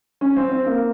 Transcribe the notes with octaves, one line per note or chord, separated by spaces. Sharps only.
C#4
C4
C4
A#3